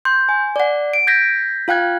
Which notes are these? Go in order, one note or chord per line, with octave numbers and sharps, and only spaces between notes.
C6 G6
G#5
D5 F#5
D7
G6 G#6 A#6 B6
F4 F5 G5 F#6 G#6